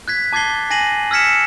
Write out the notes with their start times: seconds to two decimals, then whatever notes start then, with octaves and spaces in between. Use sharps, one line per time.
0.08 F#6 G#6 B6
0.33 A5 D6 G#6 A6 C7 G7
0.70 G#5 A#6 C7 D#7 F#7
1.11 E6 F6 G#6 B6 C#7 E7